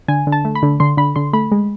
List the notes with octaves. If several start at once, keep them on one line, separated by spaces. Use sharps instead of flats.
D3 G#5
D3
A5
A3
B5
D3
D3 C6
D3 B5
D3 C6
A3 B5
G#3